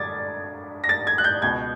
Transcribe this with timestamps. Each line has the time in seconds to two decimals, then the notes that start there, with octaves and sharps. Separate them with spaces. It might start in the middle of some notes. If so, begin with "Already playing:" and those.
Already playing: G2 D3 D6 G#6 A6
0.84 A#6
0.89 A6
1.07 G#6
1.18 F#6
1.24 G6
1.42 C#2 B2 G#6